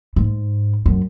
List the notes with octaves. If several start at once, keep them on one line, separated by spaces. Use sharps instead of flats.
G#2
F#2